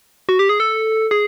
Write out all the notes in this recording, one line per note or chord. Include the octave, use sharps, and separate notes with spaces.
F#4
G4
G#4
A4
G#4